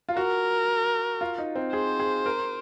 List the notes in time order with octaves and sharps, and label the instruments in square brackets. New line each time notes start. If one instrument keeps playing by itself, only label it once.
[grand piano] F4
[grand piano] F#4 [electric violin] A#4
[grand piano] F4
D#4
C4
[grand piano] G#4 [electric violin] C5
[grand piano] G#4
A#4